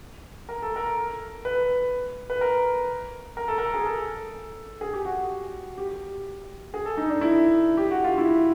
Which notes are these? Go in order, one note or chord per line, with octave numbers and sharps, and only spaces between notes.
A#4
A4
A#4
B4
B4
A#4
A#4
A4
A#4
G#4
A4
G#4
G4
F#4
G4
G#4
A4
D#4
D4
E4
G4
F#4
F4
E4